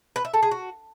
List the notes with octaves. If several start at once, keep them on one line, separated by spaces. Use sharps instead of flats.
B4
E5
A4
G#4
F#4